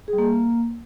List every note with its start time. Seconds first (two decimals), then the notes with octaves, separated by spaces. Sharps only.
0.08 G#4
0.13 G3
0.18 A#3